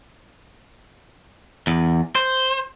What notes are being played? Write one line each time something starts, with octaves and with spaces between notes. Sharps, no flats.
E2
C5